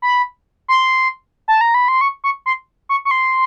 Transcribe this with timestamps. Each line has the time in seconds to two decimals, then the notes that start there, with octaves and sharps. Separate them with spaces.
0.02 B5
0.68 C6
1.48 A5
1.61 A#5
1.74 B5
1.88 C6
2.01 C#6
2.24 C#6
2.46 C6
2.89 C#6
3.05 C#6
3.11 C6